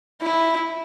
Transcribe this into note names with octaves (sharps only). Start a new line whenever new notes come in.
E4